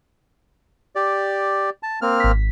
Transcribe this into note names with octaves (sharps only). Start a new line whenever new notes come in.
G4 D5
A5
A#3 C4 F6
G#1 B6